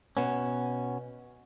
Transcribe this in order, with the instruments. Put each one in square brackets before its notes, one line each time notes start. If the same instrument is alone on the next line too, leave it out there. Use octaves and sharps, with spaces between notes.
[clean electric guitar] B2 B3 C#4